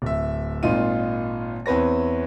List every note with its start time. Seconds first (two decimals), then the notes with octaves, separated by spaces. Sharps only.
0.02 D1 E5
0.63 G#1 A#2 D#4 F4 D#7
1.66 E2 C4 B4 C#5 A#6